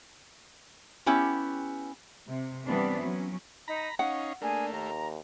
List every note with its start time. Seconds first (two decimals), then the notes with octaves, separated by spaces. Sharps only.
1.06 B3 C#4 E4 G4
2.27 C3
2.65 E3 G3 B3 C4 D4
3.00 F#3 C#4
3.68 D#4 A#5 B5
3.99 C#4 D#4 F5 F#5
4.42 A3 A#3 D4 G#4
4.73 D#2 A#5